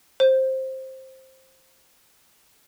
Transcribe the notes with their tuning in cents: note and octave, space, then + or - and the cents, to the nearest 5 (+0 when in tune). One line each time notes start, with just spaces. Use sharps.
C5 +10